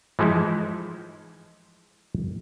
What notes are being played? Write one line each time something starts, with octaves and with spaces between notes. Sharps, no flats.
E3 F3 G#3 D#4 E4